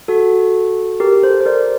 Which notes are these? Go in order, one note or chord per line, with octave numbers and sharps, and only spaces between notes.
F#4 A4
G4 A#4
A4 C5
C5
A#4 D5